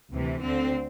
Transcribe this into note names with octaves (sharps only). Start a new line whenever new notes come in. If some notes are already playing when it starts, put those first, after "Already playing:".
D2 C3 E3
D2 D3 C4